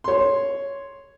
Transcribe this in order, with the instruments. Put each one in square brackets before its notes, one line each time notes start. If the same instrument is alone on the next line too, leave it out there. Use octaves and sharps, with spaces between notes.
[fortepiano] C#5 C6